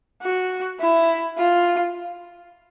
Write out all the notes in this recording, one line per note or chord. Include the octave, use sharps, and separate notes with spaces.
F#4
E4
F4